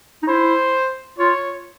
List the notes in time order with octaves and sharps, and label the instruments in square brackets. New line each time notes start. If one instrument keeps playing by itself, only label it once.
[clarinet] D#4
[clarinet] E4 [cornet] C5
[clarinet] F4 [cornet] C#5